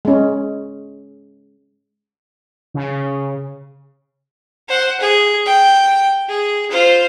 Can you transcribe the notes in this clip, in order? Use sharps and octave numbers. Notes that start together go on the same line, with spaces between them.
G#3 C#4
C#3
C5 F#5
G#4
G5
G#4
F4 C5